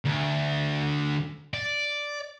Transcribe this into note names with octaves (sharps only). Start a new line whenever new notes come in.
D2
D5